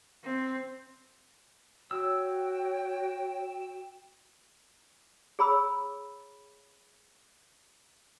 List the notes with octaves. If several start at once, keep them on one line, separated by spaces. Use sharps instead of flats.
C4
F#4 C#5 G5 E6
G#4 C#5 A#5 B5 E6